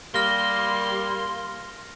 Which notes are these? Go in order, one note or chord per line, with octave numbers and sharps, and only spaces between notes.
G3 A#3 C6 F6 A#6 G7